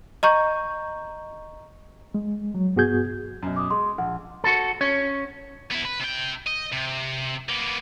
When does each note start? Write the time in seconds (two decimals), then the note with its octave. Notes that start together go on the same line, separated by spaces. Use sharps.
0.23 D#5 A#5 C#6 G6
2.14 G#3
2.55 F#3
2.76 G2 B3 F#4 G#4 G6 G#6
3.43 F#2 B2
3.56 D6 D#6
3.70 G#3 C6
3.98 A#1 F#5
4.44 F#4 A4
4.81 C#4 C#5
5.71 B3 E4
5.85 B4
6.00 C3 G5
6.47 D#5
6.73 C3
7.49 A#3 B3